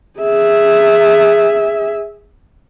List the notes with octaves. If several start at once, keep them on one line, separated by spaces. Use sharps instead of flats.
G#4 E5